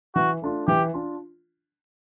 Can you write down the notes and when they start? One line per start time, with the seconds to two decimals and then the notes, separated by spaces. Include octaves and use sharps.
0.15 E3 F#4
0.42 A3 D4 F4
0.68 E3 G4
0.94 D4 F4